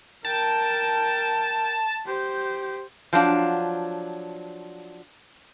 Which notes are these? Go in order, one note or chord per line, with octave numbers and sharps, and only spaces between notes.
A#4 G5 A5
G4 C5
F3 F#3 D4 F4